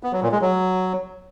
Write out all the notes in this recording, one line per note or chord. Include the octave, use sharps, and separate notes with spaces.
B3
F#3
A#2
G#3
F#3